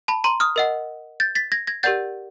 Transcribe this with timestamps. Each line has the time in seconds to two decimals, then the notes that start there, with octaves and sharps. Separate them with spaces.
0.08 A5 B5
0.24 A#5 C6
0.40 D#6 F6
0.56 A#4 D#5 F#5
1.20 G6 A6
1.35 A6 B6
1.52 G#6 A#6
1.67 G#6 A#6
1.83 G4 A#4 D5 F#5 G6 A6